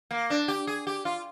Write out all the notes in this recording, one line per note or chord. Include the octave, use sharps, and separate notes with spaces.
A#3
D4
G4
G#4
G4
F4